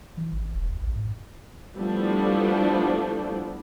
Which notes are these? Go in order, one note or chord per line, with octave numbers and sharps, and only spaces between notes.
E3
G#1
E1
D2
A1
G#2
F3 G3 A3 B3 D4 E4